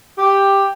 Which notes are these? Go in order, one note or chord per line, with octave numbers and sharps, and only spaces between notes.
G4